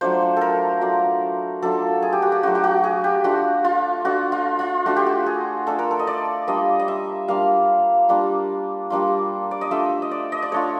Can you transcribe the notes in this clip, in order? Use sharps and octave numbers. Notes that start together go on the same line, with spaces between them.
F#3 A3 D4 F4 C5
A4 A#4
F#3 A3 D4 F4
F#3 A3 D4 F4 A4
G#4
G4
F#4
G4
F#3 A3 D4 F4 F#4
G4
F#4
G#4
G4
A3 D4 F4 F#4
F4
A3 D4 F4 F#4
F4
F4
A3 D4 F4 F#4
G4
F#4
G#4
A3 D4 F4 A4
A#4
A4
D#5
D5
G3 A#3 D4 F4 D#5
D#5
E5
G3 A#3 D4 F4 F5
G3 A#3 D4 F4
G3 A#3 D4 F4
D5
D#5
A3 D4 F4 E5
D#5
D5
D#5
D5
A3 D4 F4 C#5